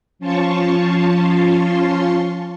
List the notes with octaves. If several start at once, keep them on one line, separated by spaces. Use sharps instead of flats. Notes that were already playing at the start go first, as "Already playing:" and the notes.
F3 C#4 F4 A5 C6 C#6